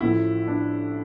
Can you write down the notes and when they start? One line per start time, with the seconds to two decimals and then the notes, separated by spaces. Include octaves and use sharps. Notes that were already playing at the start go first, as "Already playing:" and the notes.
0.01 A1 A2 F3 E4
0.48 D4